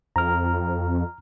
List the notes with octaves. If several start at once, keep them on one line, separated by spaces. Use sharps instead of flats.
F2 A#5 F6